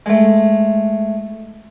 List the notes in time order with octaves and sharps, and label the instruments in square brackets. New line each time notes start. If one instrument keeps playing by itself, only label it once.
[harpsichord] G#3 A3